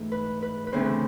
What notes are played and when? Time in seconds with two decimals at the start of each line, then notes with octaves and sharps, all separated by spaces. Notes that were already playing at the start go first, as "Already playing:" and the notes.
Already playing: G#2 E3 A3
0.12 B4
0.42 B4
0.67 B4
0.73 D2 C#3 E3 A3 C4 C5
0.85 B4